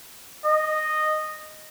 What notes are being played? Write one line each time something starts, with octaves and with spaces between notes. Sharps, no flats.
D#5